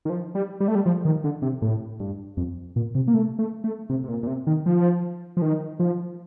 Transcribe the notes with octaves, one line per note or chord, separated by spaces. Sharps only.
D#3
F3
G3
G3
A3
G3
F3
D#3
D3
C3
A2
G2
F2
A#2
C3
A#3
A3
A3
A3
C3
C3
A#2
A#2
C3
D#3
F3
F3
D#3
F3